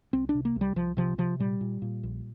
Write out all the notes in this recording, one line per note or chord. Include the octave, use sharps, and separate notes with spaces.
C2 C4
D4
C3
A#3
C2
G3
C2 F3
C3 F3
C3 F3
A#2 G3
A#2
A#2
A#1